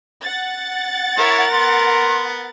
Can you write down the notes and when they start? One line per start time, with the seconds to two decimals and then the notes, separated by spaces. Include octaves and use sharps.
0.23 F#5 A6
1.18 E4 A#4 C#5 E5
1.52 B3 C6